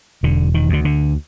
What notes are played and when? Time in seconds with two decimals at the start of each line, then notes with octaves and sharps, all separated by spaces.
0.23 E1 D3
0.54 D#3
0.69 D2 D3
0.85 D3